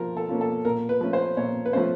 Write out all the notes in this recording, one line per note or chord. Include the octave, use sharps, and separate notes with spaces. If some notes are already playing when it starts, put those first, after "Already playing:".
Already playing: F3 A#3 A#4
A4
A#3 C#4 F4
A4
A#2 A#4
B4
F3 A3 C#4
C5
A#2 C#5
B4
F3 A3 C#4 C5